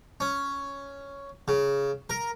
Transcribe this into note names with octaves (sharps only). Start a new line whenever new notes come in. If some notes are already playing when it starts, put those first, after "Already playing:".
C#4
C#3
A#4